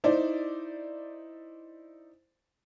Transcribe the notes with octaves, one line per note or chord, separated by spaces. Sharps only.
D#4 E4 C5 D5